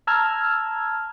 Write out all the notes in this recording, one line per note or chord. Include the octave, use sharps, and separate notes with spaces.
A5 A#5 E6 F6 G#6